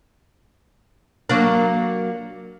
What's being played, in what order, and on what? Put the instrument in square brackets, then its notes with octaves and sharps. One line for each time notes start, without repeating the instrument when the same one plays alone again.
[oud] F#3 A#3 D4